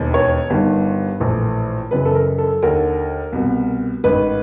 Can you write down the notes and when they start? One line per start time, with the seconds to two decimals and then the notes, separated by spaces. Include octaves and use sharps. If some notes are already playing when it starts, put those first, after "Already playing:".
Already playing: E1 D#2 D#3
0.14 C#5
0.50 G1 G2 D#3
1.20 A#1 A2 E3
1.91 F#1 F#2 C#3 E3 B4
2.05 A4
2.15 A#4
2.38 A4
2.63 D#2 D3 A#4
3.33 C2 B2
4.04 A1 G#2 D#3 B4